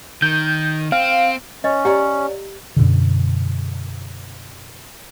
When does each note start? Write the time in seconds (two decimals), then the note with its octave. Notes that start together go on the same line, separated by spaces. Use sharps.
0.22 D#3 G6
0.92 C4 F5
1.64 C#4 C#5 D#5
1.85 G4 C#5 D5 F#5 A#5
2.76 F#2 B2 D3